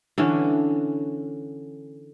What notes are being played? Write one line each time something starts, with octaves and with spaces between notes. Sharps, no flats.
D3 E3 C#4 D4